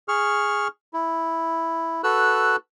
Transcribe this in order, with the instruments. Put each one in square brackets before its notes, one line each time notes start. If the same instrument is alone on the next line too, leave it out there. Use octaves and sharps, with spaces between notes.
[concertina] G#4 C#6 F6
E4
F#4 A4 B4 E6 F#6